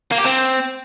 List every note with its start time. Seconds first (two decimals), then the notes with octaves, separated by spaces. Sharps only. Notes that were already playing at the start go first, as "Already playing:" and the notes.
0.12 A#3
0.18 G4
0.25 C4